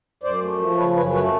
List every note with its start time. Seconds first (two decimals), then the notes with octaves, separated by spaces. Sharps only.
0.23 F#2 C5 D5
0.42 A3
0.59 F3
0.77 C#3 B4 C#5
0.96 F#2 B4 C#5
1.14 A3 B4 C#5